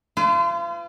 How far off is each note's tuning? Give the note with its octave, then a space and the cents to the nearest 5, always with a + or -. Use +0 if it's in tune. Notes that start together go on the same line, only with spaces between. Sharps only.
F4 -35 B4 +45